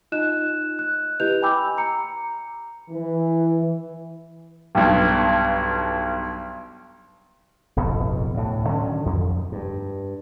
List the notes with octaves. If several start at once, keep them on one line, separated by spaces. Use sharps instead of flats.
D#4 F4 D#5 F#6 E7
F#6
E4 G4 B4 D#5 G6 F7
G5 G#5 B5 D6 E6 G6
A#5 C#7
E3
B1 G2
D1 G1 F2 B2
D2 A2
D3 D#3 F#3 C#4
F2
G2